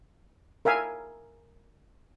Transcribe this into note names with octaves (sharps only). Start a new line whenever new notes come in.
A#4 E5 F5 G#5